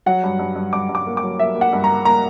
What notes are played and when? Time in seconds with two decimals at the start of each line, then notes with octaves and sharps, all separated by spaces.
0.06 F#3 F#5
0.23 G2
0.39 G2
0.56 G2
0.73 G2 D6
0.89 G2
0.95 D6
1.07 A#3
1.17 D6
1.23 F#3
1.39 A#3 E5
1.55 A#3
1.61 F#5
1.73 G2
1.84 A#5
1.90 A#3
2.05 A#3 A#5